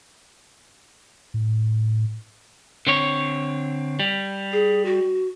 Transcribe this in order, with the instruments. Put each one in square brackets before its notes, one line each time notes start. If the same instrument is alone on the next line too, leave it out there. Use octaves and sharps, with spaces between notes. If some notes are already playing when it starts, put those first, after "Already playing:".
[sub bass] A2
[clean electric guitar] D3 C4 C#5
G3
[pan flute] G#4
F#4